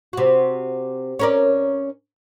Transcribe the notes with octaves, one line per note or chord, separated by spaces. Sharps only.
C3 F#4
C#4 A#4 D5